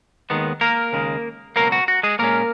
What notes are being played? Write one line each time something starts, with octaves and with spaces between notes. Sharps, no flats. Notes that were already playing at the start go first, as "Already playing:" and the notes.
D#2 D#3 G#3 B3
A#3 A#4
D#2 C#3 G#3
C#2 B2 F#3 A#3 A#4
F#4
F#4
G#3 G#4
A#2 G#3 A#3 C#4 A#4